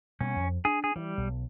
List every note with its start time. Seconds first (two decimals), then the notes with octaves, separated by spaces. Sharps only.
0.21 B2 G3 A#3 C#4
0.36 F2
0.65 D4 G#4
0.84 G#4
0.96 E3 G3
1.18 B1